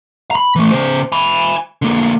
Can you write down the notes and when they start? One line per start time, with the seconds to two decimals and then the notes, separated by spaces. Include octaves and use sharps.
0.31 A#5 B5
0.56 E3 A3
0.71 C#3 C5
1.12 G#5 B5
1.82 D3 A#3